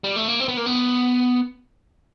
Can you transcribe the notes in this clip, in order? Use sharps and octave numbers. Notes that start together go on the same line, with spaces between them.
G3
A3
A#3
C4
B3
A#3
B3